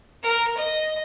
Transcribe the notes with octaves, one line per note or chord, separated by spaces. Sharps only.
A#4
D#5